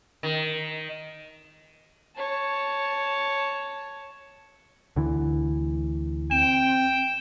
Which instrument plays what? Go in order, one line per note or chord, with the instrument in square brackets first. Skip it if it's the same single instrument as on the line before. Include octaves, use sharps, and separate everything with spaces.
[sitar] D#3
[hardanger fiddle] C#5 A5
[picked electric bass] D2 D3 E3
[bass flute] C4 [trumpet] G5 [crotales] E7